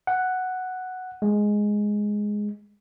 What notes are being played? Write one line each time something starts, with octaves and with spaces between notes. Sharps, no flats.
F#5
G#3